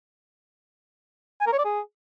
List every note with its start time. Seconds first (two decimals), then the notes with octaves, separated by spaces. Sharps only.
1.41 G#5
1.47 A#4
1.53 C#5
1.59 D5
1.65 G#4